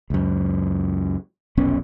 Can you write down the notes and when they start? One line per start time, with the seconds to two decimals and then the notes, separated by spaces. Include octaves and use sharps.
0.10 C#2 F#2
1.57 F1 B1 B3 C#4